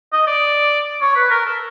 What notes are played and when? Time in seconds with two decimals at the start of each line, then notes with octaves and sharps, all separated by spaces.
0.12 D#5
0.27 D5
1.01 C#5
1.16 B4
1.31 A#4
1.46 A4